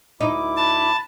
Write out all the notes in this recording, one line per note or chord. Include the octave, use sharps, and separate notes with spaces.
D2 D#4 E4 D6
A5 B5